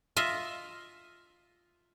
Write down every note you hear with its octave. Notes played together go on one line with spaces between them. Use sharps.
F4 D#5 E5